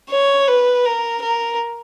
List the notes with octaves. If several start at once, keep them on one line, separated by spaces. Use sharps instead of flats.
C#5
B4
A#4
A#4